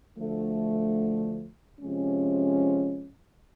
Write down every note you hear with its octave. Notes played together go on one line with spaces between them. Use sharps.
D2 D3 F3 A3
C3 F3 G#3 C#4